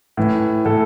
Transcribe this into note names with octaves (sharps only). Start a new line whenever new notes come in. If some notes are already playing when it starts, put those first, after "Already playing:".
A2 E3
A2 E3 A4